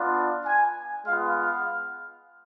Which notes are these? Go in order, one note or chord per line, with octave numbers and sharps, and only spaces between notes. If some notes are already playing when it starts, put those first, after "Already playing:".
Already playing: B3 D4 F4
G#5
G#3 B3 F4 F5
F5